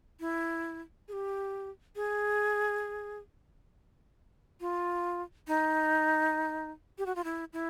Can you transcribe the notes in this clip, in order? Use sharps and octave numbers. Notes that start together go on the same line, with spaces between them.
E4
G#4
G4
G#4
F4
D#4
G4
F#4
F4
E4
E4